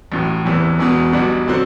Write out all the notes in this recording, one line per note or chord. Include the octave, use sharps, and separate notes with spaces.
A1 A2 F#3
F#1 E2 C3 E3
E1 E2 B2
B1 B2 G3 D4 F#4
D3 F#3 C4 F#4